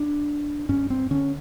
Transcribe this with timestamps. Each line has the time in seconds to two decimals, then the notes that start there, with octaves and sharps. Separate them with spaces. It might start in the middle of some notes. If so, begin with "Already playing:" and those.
Already playing: D4
0.69 G2 C#4
0.90 C4
1.11 D3 C#4